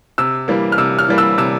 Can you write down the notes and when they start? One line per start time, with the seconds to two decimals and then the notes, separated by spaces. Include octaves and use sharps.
0.18 C3 E6
0.48 E3 G3 A#3
0.72 F6
0.78 C3 E6
0.99 F6
1.08 E3 G3 A#3
1.18 E6
1.38 C3 E6